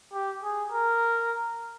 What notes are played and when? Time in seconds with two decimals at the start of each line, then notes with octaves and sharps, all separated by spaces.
0.13 G4
0.43 G#4
0.72 A#4